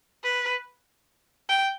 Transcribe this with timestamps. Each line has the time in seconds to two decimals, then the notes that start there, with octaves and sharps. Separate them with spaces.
0.23 B4
1.49 G5